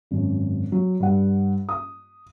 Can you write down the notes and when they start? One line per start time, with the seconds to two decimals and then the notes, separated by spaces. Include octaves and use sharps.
0.11 G#1 F#2
0.72 F#3
1.00 G2 F#5
1.69 D#6